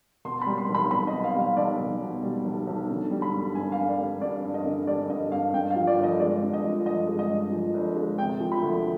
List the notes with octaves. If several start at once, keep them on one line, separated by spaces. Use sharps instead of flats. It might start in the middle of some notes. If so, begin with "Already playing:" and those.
B2 C6
B5
G3
C6
B1
B5
B1 B5
D#5
B2
F5
G3
F5
B1 D5
B1
B2
G3
B1
B1
D3
G3
B5
G2
G2 G#5
F5
D3
D5
G3
G2 D5
G2
D#5
D3
G3 D5
G2 D#5
G2 F5
G2 G5
F5
F3
D5
G1
D#5
G#3 D5
G2
D#5
F3
G1 D#5
G#3
D#5
G2
F3
G1
G#3
C3 G5
F3
B5
D2